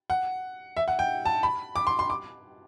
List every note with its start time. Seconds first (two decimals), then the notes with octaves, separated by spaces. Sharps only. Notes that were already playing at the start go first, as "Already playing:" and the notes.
0.10 F#5
0.77 E5
0.88 F#5
0.99 G5
1.26 A5
1.43 B5
1.76 D6
1.87 C6
1.99 C6
2.10 D6